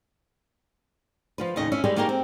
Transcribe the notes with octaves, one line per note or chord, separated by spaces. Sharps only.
F3 F4 B4
D#2 A2 C#3 C#4 D#5
C#4 E4 E5
G3 G#3 G4 G#4 B4
A3 A#3 D#4 G4 G#4 A#4
C4